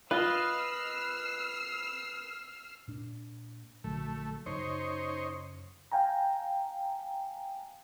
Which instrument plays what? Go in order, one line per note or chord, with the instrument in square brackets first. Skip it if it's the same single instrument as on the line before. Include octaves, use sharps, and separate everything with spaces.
[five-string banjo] F4 [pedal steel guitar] B4 D#5 [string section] E6 F6 C7
[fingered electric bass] A#2 D4
[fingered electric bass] A#1 D3 F#3 [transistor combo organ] A3
[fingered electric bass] F#2 C#3 [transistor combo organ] D#4 C5 C#5
[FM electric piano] F5 G5 G#5 A#5